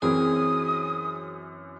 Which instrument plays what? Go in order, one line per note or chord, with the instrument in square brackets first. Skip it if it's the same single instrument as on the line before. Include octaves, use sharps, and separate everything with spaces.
[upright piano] F#2 E3 [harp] C4 A#4 G#5 [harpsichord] G#4 [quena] D#6